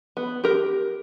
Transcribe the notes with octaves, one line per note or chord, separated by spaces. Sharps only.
B3
G4 A#4